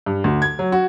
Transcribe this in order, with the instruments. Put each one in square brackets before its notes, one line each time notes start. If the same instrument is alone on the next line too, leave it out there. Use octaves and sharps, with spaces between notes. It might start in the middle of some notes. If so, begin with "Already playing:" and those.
[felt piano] G2
D2
G#6
F#3
F#4